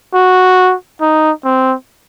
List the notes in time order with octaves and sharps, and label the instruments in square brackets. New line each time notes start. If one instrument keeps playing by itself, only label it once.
[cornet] F#4
D#4
C4